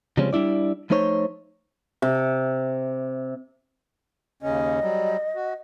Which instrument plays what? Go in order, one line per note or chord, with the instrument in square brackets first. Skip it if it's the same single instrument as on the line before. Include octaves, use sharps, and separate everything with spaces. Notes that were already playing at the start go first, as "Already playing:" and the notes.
[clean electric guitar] C#3 F3 G3 G#3 C4 C#4
G3 D4 E4 D5
F3 A3 D#4 C5 C#5
[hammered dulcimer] C3
[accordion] D#2 C#3 C#4 [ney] D#5
[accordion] F#3 G3
F#4